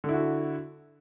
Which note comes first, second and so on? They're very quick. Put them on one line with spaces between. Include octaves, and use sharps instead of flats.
D3 E4 F#4